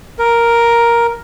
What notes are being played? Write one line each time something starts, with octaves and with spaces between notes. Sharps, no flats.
A#4